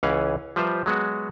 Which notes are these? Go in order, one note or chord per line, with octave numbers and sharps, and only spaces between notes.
C#2 E3 C#4 F5 F#5 G#5
F3 G3 B4 C5 E5 A#5
F#3 G#3 B3 F#4